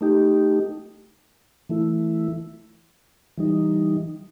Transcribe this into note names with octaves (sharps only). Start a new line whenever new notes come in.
A3 D#4 G4
E3 A3 E4
E3 G3 D#4